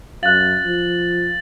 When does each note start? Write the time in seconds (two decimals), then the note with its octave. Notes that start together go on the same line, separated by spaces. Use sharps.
0.23 F#2 F5 F#6 A6 F#7
0.64 F3